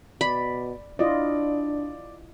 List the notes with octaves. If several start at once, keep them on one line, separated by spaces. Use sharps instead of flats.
B2 D5 B5
D4 E4 F4 D5 D#5